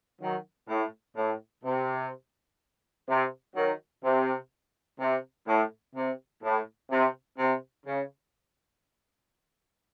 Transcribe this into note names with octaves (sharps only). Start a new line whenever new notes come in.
D#3 F#3
A2
A2
C3
C3
D#3 F#3
C3
C3
A2
C3
A2
C3
C3
C#3